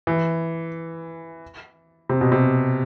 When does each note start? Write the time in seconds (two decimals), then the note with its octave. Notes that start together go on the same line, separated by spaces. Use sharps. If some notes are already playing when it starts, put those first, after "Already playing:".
0.07 E3
2.09 C3
2.21 B2
2.32 C3